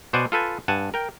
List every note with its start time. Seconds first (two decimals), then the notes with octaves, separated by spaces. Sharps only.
0.13 B2 C5 D5 F#5 G#5
0.32 F4 A4 B4 G#5
0.68 G2 F#5 G#5 A5
0.94 A#4 G5